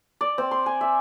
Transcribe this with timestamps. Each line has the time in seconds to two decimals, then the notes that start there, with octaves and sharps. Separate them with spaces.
0.21 D5
0.38 C4
0.51 C6
0.66 G#5
0.81 E5